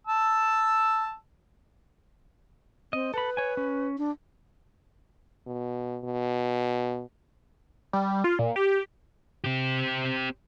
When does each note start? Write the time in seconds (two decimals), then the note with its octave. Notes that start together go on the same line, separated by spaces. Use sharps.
0.07 A5 E6
2.93 C4 D#5
3.14 A4 B4 B5
3.37 C#5 G#5
3.57 C#4
3.98 D4
5.47 B2
6.04 B2
7.93 G3
8.24 F4
8.39 A#2
8.56 G4
9.44 C4 G4